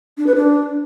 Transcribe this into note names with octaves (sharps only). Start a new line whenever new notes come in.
D4
B4
D4